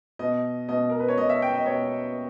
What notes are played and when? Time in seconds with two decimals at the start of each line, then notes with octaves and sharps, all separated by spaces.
0.19 B2 D#5
0.69 B2 D#5
0.90 A#4
1.00 B4
1.08 C#5
1.18 B2 D#5
1.29 E5
1.42 G5
1.55 D#5
1.66 B2 C#5